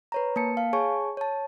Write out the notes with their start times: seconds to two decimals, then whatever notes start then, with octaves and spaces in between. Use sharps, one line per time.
0.12 B4 C#5 A#5
0.36 A#3 A5 C#7
0.57 F5
0.73 G#4 C#5 G#5 A5 C#6
1.17 C#5 A5